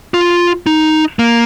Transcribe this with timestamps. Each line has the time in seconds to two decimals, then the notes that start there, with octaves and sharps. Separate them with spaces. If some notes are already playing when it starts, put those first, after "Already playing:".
0.14 F4
0.66 D#4
1.19 A#3